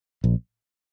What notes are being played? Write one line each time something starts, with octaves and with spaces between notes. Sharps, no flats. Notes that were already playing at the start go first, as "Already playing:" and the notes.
A#1